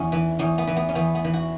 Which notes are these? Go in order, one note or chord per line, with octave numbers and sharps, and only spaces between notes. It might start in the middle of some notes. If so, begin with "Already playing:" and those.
Already playing: E2 C#4
E3
E2 C#4
B3
E3
B3
C#4
E2 B3
B3
E3
F#4